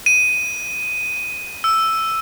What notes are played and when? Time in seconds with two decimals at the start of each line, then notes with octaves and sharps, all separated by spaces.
0.06 D#7
1.64 E6